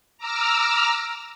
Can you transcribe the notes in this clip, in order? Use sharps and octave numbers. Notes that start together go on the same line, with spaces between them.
A#5 D6 E6 F6